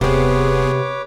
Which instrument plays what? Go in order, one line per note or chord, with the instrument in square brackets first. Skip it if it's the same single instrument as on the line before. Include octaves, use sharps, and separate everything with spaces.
[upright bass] D#1 [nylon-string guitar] C3 C4 [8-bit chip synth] B3 G#4 [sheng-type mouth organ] B4 C#5 D6